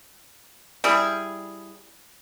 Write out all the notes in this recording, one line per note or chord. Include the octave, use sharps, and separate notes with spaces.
G3 E4 G#4